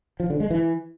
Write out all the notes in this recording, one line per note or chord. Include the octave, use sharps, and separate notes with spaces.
F3
D3
G#3
E3